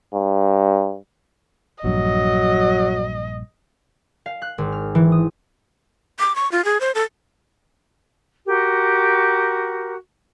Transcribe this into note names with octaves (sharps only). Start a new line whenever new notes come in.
G2
A#1 G2 F#3 D#5
F5
F#6
G#1
F6
E3
D#6
D6
C#6
F4
G#4
C5
A4
F#4 G4 A#4